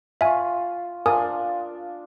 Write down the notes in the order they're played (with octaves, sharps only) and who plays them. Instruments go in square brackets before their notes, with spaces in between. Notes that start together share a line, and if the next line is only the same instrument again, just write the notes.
[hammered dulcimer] F4 C#6 [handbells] E5 G#5
[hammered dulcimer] D4 F4 [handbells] A#4 G#5 D#6